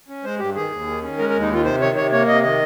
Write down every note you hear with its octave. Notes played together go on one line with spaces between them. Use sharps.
C#4
G#3 C5
G2 G4
D#3 G#4
D#2
D#3
C#4
G#3 A#4
A#4
D#2
D#4
D#3 F4
C3 C5
D#3 C#5
C3 C#5
A#3 C#5
C3 D#5
D#3 D#5